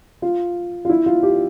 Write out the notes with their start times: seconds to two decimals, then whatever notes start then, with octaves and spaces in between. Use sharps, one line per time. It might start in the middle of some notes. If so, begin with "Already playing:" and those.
0.22 F4
0.85 F4
0.89 E4
1.06 F4
1.23 G4